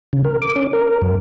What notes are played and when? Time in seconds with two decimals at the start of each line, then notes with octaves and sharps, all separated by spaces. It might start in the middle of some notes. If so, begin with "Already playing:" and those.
0.13 C#3
0.25 A#4
0.42 D6
0.56 C#4
0.73 A#4
1.02 F#2